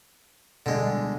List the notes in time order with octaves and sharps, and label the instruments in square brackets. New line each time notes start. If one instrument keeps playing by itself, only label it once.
[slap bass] B2 G3 [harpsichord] D3 G#3